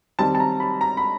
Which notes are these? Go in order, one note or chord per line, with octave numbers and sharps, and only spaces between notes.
D#3 G3 C4 A5
A5
A#5
B5
A#5
B5